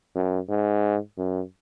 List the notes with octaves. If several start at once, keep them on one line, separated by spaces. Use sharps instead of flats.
F#2
G#2
F#2